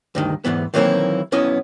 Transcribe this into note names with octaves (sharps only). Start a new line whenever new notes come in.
D2 G2 D#3
E2 G#2 E3 B3
D#3 E3 F#3 A#3 C4 E4
B1 B3 C#4 E4 D#5